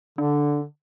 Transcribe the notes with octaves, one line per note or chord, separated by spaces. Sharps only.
D3 D4